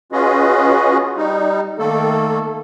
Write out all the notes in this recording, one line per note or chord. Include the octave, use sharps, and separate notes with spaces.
C#4 F4 F#4 G#4 B4 D#5
G3 D#4
D#3 A3 A#3 A4